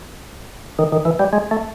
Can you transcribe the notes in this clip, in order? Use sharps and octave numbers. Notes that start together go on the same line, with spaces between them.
D#3
D#3
E3
G3
G#3
A3